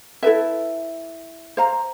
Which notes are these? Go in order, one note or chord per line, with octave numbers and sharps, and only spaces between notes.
E4 A4 B4 E5
C5 F5 A#5